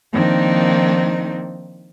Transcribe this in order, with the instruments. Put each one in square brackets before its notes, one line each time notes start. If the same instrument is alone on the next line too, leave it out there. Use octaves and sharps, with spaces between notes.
[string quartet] D#3 F3 A#3 C4 D4 D#4